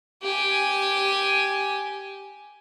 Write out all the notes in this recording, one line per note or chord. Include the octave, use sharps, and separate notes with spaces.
G4 G#5